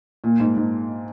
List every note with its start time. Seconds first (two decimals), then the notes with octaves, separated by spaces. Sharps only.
0.24 A#2
0.40 G#2
0.57 G#2